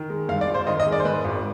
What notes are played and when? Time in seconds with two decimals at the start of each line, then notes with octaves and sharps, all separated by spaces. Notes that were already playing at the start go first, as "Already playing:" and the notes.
Already playing: D#3
0.10 G#3
0.29 G2 F5
0.41 D5
0.48 G#1
0.54 C5
0.67 D#3 D#5
0.80 D#5
0.86 G#3
0.92 D5
1.00 C5
1.05 G#2 B4
1.25 G#1